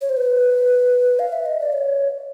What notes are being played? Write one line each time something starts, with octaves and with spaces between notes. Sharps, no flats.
C#5
C5
B4
F5
E5
D#5
D5
C#5